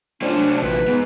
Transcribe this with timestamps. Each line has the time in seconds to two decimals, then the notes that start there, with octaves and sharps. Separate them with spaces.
0.22 A2 F3 A3 C#4 D4 C5 C#5
0.35 C3 F#3
0.63 A#1 E3 B4
0.88 G#2 B3 D#4